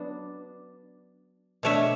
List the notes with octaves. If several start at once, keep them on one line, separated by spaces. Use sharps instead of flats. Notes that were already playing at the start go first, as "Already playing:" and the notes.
Already playing: F#3 B3 D4 D5
B2 A3 D4 C#5 E5